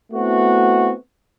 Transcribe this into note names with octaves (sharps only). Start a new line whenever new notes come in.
A3 B3 C4 E4 F#4